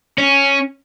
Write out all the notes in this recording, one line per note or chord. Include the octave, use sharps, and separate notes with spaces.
C#4